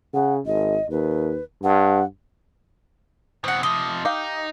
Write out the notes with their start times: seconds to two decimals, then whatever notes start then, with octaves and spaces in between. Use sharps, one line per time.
0.14 C#3 F#5
0.45 G#1 D#5
0.90 D#2 B4
1.63 G2 F#5
3.44 B2 E3 C4 F#5
3.63 C3 F3 D#5
4.05 D#4 G4 F5